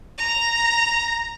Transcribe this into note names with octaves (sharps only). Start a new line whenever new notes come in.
A#5